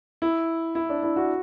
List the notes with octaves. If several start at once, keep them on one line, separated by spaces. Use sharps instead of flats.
E4
E4
D4
E4
F#4